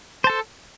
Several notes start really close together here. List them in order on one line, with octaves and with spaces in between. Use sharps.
C5 A5 A4